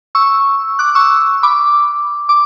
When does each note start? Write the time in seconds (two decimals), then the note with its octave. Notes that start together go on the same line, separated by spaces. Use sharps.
0.15 C#6 E6
0.79 D6 F#6
0.95 C#6 E6
1.43 B5 D6
2.29 D6